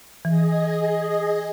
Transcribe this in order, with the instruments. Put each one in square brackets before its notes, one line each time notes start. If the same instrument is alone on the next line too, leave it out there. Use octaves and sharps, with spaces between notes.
[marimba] E3 [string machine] G#4 D#5